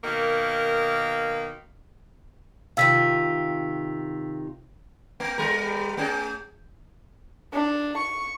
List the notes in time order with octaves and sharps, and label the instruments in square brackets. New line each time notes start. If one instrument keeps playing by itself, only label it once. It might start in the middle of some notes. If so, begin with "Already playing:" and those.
[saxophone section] B2 D#3 A#3
[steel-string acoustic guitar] C3 D#3 F4 [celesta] F5 E6 B6
[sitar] A3
E2 G3 A#4
A3 C#4 G#4
[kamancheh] D4
C#6